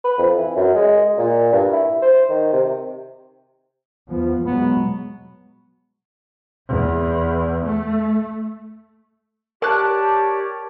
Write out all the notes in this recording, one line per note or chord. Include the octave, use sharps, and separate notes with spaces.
B4
F2
E3
F#2
G#3
A#2
G2
E4
C5
D#3
C3
E2 F3 B3
B2 F#3 G#3 B3
E2
A3
G4 A#4 C#5 D5 A5 F#6